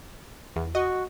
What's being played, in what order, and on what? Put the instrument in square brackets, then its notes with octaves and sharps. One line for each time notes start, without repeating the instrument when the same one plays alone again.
[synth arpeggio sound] E2
[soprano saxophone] F#4 [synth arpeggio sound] D#5